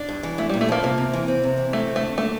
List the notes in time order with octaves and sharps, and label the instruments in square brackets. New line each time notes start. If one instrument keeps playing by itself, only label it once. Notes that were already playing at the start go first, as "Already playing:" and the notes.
Already playing: [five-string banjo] D4
[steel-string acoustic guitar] G2
E3
[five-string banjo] A3 [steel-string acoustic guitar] E4
[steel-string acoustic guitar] A#2 [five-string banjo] G3
[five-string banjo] A3
[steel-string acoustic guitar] F3 [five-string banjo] A#3
[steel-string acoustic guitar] C3 [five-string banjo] A#3
[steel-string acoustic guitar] C3
E3
C4
C3
E3
[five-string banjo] A3 [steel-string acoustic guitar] C4
[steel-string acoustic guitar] D2
[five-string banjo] A3
[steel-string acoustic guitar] D3
[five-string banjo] A3 [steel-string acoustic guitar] A#3